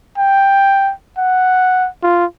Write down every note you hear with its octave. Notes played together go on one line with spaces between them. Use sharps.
G5
F#5
F4